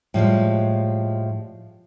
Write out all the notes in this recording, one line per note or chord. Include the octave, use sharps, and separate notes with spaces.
A2 F3 G3 G#3